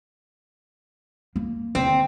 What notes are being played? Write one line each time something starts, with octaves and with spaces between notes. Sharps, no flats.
A#3
D#2 D3 C4